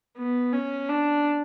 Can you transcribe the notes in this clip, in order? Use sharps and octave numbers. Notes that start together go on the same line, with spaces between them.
B3
C#4
D4